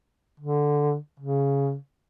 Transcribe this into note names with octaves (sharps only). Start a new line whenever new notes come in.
D3
C#3